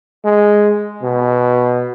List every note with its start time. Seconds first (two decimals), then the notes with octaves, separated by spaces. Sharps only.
0.24 G#3
1.03 B2